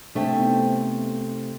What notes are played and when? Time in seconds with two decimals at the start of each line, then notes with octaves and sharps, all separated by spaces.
0.15 C3 A3 D4 C5 G5
0.36 B3 D#4